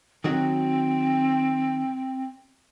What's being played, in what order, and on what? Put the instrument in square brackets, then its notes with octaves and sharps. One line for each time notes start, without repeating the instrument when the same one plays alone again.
[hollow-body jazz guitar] D#3 F#3 F#4 [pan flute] C4